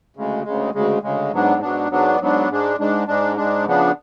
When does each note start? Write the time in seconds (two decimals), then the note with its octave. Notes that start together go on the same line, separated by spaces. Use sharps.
0.16 D2 C#3 G#3
0.44 D2 C#3 G#3
0.74 D2 C#3 G#3
1.03 D2 C#3 G#3
1.33 G#2 F#3 B3 D4
1.62 G#2 F#3 B3 D4
1.91 G#2 F#3 B3 D4
2.20 G#2 F#3 B3 D4
2.50 G#2 G#3 D4
2.78 G#2 G#3 D4
3.08 G#2 G#3 D4
3.36 G#2 G#3 D4
3.66 C#3 F3 B3 D4